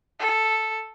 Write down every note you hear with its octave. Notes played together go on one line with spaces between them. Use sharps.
A4